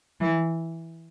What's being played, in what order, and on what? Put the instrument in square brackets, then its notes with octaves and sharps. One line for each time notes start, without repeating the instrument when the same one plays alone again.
[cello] E3